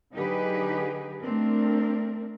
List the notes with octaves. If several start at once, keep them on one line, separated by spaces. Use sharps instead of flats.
D3 F#3 D#4 G4 G#4 B4
A3 C4 D4 A#4